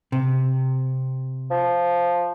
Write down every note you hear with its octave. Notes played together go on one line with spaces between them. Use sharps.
C3
F3